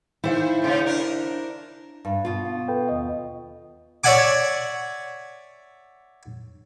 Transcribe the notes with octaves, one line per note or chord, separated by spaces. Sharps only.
D#3 E4 C5 F5
A2 C#3 C#4
D4 A#4
G2
B2 F4
A4 B4 G5
D#2 D#5
C#5 D5 E5 F#5 G#5 D6